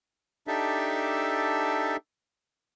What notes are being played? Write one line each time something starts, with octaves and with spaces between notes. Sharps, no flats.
D4 D#4 G4 A4 E5